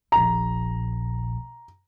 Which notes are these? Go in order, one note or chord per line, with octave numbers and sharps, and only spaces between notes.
D#1 A#1 A#5